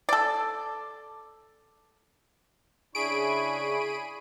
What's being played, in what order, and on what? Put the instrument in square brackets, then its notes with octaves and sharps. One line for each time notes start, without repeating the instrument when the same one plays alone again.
[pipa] A4 D5
[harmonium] C#3 D4 E4 [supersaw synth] G#4 B5 D#7 [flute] C#6 [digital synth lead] D7